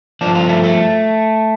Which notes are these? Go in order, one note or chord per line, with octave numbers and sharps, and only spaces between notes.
G2 F3 D4
F4
A3
A3